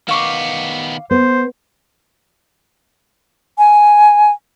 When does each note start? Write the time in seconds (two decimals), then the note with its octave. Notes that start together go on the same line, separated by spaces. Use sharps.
0.09 D#3 B3 F5 C#6 D6
1.11 B3 C5
3.58 G#5